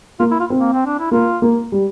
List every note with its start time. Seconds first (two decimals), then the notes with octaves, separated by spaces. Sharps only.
0.20 A#3 F4
0.31 E4
0.40 F4
0.50 C4
0.60 A#3
0.73 C4
0.86 D4
0.99 E4
1.11 A#3 F4
1.42 A#3
1.72 G3